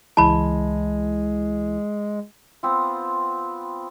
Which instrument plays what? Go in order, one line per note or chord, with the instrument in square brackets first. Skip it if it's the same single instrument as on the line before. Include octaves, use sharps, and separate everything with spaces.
[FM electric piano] C#2 E3 E4 [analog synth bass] G#3 [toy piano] A5 B5
[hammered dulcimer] B3 C4 F4